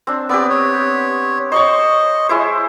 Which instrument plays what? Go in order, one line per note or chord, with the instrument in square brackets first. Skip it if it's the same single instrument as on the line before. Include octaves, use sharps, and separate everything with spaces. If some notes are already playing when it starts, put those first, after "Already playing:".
[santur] C4 D4
[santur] B3 C4 G4 [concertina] D5
[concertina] C#5
[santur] C5 C#5 C#6 [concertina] D#5
[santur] G#3 E4 C5